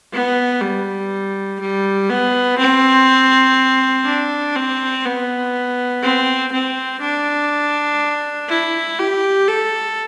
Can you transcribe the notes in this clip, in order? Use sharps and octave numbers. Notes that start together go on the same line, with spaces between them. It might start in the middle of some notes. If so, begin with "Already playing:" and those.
B3
G3
G3
B3
C4
D4
C4
B3
C4
C4
D4
E4
G4
A4